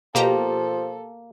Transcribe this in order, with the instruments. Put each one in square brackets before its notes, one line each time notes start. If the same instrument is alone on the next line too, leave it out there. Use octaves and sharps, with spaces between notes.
[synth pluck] B2 G4 A#5 [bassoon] F3 [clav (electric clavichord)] A#3 [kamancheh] A4